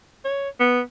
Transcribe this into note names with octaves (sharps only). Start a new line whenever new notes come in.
C#5
B3